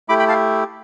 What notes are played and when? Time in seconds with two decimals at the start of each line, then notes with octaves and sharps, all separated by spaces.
0.09 A3 E4 G4 B5 D6
0.19 G5 B5
0.28 F5 A5